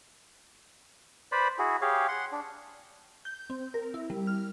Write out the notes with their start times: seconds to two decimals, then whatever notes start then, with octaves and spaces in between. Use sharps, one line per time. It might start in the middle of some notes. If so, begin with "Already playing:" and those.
1.32 B4 C5 D5 B5
1.59 E4 F#4 G#4
1.82 G4 G#4 C#5 F5
2.08 F#5 C6
2.32 D4
3.25 G6
3.50 C4
3.74 A#4
3.94 E4
4.10 G3
4.27 F6